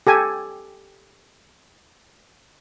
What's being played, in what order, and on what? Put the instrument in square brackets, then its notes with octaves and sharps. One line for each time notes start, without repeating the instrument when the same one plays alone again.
[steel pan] G4 A4 G#5